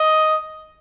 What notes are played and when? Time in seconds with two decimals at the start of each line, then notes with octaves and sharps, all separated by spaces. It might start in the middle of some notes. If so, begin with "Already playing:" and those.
Already playing: D#5